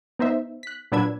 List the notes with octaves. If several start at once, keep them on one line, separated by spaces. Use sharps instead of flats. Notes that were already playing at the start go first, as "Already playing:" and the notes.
B3 D#4 C5 E5
F#6 B6
A#2 F#3 D4 B4 E6 G#6